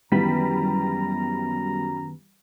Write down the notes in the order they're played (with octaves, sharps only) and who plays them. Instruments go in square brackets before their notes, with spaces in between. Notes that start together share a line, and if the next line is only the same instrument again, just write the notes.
[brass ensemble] F#2 A#5 [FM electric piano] D#3 B3 [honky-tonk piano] E3 G3 B6